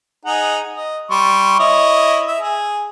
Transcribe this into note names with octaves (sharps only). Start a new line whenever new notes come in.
D#4 G#4 F#5
D#5
G3 C6 C#6
E4 C#5 D#5
E5
G#4